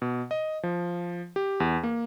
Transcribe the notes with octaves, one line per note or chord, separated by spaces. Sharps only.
B2
D#5
F3
G4
E2
A#3